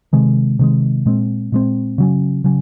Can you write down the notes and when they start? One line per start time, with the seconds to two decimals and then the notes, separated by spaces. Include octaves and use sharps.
0.13 C3 D#3 G#3
0.59 C3 D#3 G#3
1.06 A#2 G#3 C4
1.52 A#2 G#3 C4
1.98 C#3 F#3 C#4
2.44 C#3 F#3 C#4